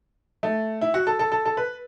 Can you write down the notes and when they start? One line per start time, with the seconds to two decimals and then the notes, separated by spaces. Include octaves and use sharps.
0.43 A3
0.81 E4
0.94 F#4
1.07 A4
1.19 A4
1.32 A4
1.45 A4
1.57 B4